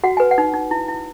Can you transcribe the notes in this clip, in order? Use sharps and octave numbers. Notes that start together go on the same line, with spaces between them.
F#4 F#5
B4 G#5
F#5
D#4
D#4
E4
E4